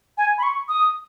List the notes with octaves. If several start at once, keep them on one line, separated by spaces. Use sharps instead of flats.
G#5
B5
C#6
D#6